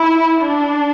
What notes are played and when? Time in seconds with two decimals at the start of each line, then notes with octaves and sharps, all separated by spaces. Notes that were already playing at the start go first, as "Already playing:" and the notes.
Already playing: E4
0.41 D4